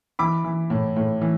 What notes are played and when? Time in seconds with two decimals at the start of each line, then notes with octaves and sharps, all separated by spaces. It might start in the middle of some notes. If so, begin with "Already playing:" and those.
0.19 E3 B5 D6
0.44 E3
0.70 A2
0.96 A2
1.21 E3